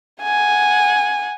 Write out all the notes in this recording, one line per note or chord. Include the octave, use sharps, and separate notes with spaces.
F#5 G#5